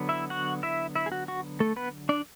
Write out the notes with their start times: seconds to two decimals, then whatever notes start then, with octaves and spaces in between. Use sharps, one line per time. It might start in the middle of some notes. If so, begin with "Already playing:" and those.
Already playing: D3 F#3 B3
0.09 E4 E5
0.30 F#4 F#5
0.63 E4 E5
0.95 E4 E5
1.06 G#4
1.12 F#4
1.28 F#4
1.60 A3 A4
1.76 B3 B4
2.09 D4 D5